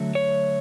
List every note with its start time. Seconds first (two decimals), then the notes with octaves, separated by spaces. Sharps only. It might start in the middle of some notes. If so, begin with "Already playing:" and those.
Already playing: D3 F#3 A3
0.15 C#5